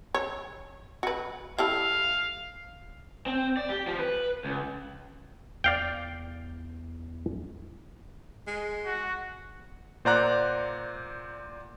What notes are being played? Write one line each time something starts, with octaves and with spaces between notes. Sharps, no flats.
C#5
F#4 B4
G3 E4 A4 F5
C4
D5
G4
F3
B4
C#2
E2 D5 F5 G5
G#3
F#4
A#2 C5 D5 F#5 A#5 F#6